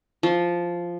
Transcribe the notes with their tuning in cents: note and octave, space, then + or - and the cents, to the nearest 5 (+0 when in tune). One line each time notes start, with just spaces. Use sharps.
F3 -5